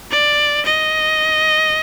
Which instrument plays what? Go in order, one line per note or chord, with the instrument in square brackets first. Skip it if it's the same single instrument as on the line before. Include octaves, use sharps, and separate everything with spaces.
[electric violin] D5
D#5